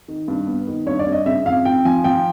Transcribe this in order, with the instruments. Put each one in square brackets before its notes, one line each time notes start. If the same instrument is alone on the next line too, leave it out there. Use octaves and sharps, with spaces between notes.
[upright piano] D#3
G2
B3
D#3
G2 C#5
D5
G2
D#5
C#3 E5
F2 F5
F2 G5
F3 G#5
F3 G5